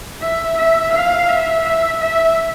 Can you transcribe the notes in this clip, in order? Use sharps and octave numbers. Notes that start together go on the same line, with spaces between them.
E5
E5
F5
E5
E5
E5